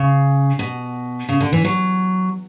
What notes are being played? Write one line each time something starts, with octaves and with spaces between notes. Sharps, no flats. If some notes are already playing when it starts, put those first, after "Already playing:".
Already playing: C#3
B2
C#3
D3
E3
F#3